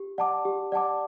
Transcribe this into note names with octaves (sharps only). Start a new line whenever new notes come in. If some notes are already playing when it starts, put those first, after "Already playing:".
Already playing: G4
D5 F#5 A5 D6
G4
D5 F#5 A5 D6